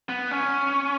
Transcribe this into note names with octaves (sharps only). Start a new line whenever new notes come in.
B3
C#4